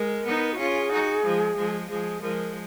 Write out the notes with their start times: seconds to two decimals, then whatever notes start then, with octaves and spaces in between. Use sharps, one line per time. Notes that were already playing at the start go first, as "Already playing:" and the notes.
Already playing: G#3 A#4
0.26 B3 D#4
0.53 F#4
0.58 C#4 F4 G#4
0.91 D#4 F#4
1.24 F3 G#3
1.57 F3 G#3
1.89 F3 G#3 G#4
2.22 F3 G#3 A#4